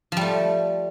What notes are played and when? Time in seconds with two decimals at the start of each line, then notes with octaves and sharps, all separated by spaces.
0.12 F3
0.17 G3
0.21 A3